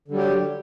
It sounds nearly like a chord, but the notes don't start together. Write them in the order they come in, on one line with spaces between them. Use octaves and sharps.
D3 G3 F#3 G4